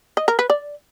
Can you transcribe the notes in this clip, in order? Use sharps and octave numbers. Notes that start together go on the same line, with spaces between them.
D#5
A#4
B4
D5